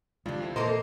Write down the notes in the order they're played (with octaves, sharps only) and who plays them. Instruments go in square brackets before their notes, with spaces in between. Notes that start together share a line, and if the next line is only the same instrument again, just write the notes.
[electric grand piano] F2 D4 [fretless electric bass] C3 D#3 G#3 [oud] G3 F4
[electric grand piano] F2 C4 E4
[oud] D#2 E3 A4 [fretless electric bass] A#2 [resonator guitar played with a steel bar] A#3 A#4 C5 [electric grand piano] D#5